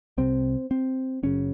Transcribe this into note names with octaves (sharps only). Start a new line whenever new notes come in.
C2 C3 C4
C4
F#1 F#2 C#3 C#4